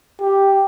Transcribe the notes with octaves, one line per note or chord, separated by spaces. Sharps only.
G4